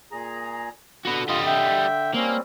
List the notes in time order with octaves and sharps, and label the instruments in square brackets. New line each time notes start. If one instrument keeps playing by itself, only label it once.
[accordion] A#2 G#4 A#5
[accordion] D3 [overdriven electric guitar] F#4 B4
[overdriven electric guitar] G3 D#5 [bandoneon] F4
[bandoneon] E5 G5
[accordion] G3 C4 C#4 [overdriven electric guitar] A#3